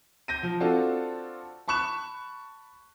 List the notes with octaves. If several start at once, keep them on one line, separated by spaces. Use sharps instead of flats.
G6 A#6 D#7
F3
C4 D4 F4 F#4 A4
A5 B5 C#6 F#6 E7